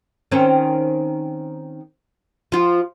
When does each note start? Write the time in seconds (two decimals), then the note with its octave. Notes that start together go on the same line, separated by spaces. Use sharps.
0.32 D#3 C4 C#4
2.52 F3 F4